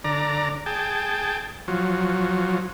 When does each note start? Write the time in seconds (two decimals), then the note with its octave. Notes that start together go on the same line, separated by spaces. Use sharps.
0.04 D3 D5 A#5
0.66 G#4 G5 A5
1.68 F3 F#3